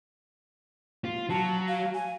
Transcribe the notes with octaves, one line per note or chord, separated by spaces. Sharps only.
F4
F#3 A5
F5
G#5